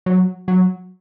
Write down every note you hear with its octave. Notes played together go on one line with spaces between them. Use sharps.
F#3
F#3